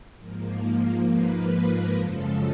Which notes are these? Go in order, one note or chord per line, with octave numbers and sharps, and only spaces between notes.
G#2 F3 A#3
B4
A#4
F#2 C#3 F3 G#3 A4